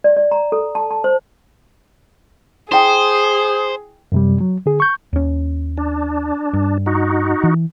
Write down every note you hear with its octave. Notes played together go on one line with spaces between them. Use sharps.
D5
D5
A#5
A4
A5
A5
C5
E4 G#4 C5 G5 D#6
F#2 C3 G3
F#3
D3 G#4
C#6 G6
D#2 C#4
D4
G2
D#4 F#4
E3